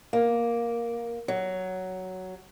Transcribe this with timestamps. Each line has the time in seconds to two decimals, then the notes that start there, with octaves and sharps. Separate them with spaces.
0.13 A#3
1.28 F#3